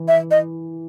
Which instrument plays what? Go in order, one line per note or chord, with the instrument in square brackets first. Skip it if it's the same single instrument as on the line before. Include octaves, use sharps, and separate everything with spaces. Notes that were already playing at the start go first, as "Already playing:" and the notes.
Already playing: [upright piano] E3
[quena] E5
D#5